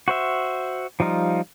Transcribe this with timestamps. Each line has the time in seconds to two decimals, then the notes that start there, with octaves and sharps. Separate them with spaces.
0.08 F#4 C5 E5
1.00 F3 G3 D#4 F4